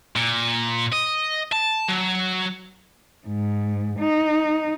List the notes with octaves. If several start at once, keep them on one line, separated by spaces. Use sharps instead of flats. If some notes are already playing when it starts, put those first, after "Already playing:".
A#2
D#5
A5
F#3
G#2
D#4